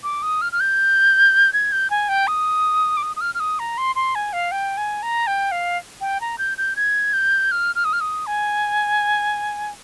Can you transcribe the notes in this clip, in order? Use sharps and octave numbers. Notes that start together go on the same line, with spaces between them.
D6
D#6
F6
F6
G6
G#6
G6
G#5
G5
D#6
D6
D#6
D#6
F6
F6
D#6
A#5
C6
C6
G#5
F5
G5
G#5
A#5
G5
F5
G5
A#5
G6
G6
G#6
G6
F6
F6
D#6
F6
D#6
G#5